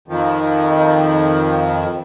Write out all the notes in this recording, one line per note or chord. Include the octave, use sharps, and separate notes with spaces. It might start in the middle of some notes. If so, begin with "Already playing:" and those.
F2 D#3 F3